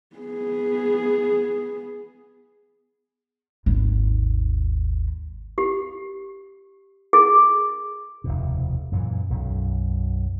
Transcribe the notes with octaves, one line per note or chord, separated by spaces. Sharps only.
B3 G#4
G#1 D#2
G4
G#4
F1 D#2 B2
F#2 A#2 E3
B1 F#2 B2